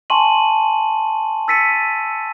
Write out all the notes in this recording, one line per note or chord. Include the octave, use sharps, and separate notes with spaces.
G#5 A5 C6 C#6 D#7 F#7
E6 A6 B6 C#7 D#7